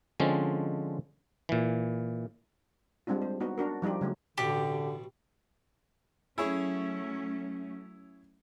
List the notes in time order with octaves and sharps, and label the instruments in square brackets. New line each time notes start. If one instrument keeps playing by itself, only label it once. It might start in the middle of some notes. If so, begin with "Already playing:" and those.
[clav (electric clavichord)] D3 F3 G#3 C4 C#4
A#2 E3
[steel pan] G3 G#3 C4 D4 F4
C5
B3 D#4 F#4
D4 F#4 A#4
F3 G3 D#4 F4 G4
C#3 F#3 A3
[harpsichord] A1 B2 A5 [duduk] D3 [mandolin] G4
[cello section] F#3 A3 C#4 [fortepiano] E4 G#4 C#5